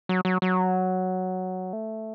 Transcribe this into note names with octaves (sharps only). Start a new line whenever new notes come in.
F#3
F#3
F#3
A3